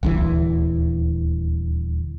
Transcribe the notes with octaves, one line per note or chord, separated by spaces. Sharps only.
D#1 D2 E3